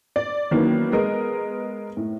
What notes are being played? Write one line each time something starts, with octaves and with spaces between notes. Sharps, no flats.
D5
D#3 E3 F#3 A#3 B3 C#4
G#3 B3 A#4 D#5
A2